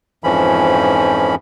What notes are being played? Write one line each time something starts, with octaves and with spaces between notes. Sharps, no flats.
F2 G#2 E3 F3 C#4 B5